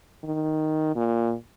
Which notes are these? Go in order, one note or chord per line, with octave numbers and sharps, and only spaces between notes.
D#3
A#2